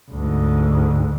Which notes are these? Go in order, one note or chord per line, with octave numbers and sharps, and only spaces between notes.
D2 G#2